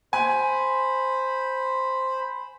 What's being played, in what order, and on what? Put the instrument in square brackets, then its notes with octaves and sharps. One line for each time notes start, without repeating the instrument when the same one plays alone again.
[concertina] C5 B5 [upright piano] G#5